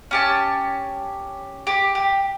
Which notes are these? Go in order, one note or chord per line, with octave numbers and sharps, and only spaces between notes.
C#4 G4 A5
G4
G4